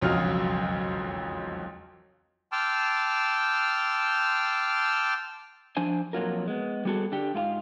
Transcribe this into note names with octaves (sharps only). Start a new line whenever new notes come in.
E1 B1 F2 C#3 F#3 F6
G5 A5 C6 D6 E6 F6
F3 D4 C5 G#5
F2 A#2 F#3 F4 A#4
G#3 B3
G3 B3 C4 F#4 G#4 A4
D3 D4 G4
G#2 F4 A4 F5